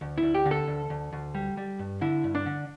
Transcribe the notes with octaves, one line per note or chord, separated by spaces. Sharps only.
D2
E4
D2
G4
D3
A4
D2
D2
D2
G3
G3
G2
D3 E4
G2
D4
D3